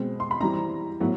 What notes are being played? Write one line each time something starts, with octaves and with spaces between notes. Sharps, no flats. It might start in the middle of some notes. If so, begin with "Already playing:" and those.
Already playing: B2 G#3 C4
C6
B5
E3 G3 C4 A#5
A2 F#3 B3